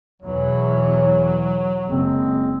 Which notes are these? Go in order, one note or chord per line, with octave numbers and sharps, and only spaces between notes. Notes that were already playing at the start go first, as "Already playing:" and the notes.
E2 B2 E3 F#3 C#5
F#1 G#3 C4